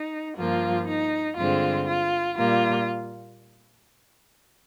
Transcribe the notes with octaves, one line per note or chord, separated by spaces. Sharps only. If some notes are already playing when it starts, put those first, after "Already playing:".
Already playing: D#4
G2 F3 A#3 F4
D#4
G2 D3 G#3 C4 F4
F4
A#2 G3 A#3 F4